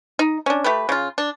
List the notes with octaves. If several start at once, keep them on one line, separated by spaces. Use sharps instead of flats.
D#4
C#4 D4
A3 G4 B4
C#3 F4
D4